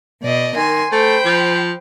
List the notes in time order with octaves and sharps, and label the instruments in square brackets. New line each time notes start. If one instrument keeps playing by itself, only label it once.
[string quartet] B2 D5 D#5
[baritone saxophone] D#3 [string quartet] A#4 G#5 C6
[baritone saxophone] A3 [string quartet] C5 G5 B5
[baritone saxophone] F3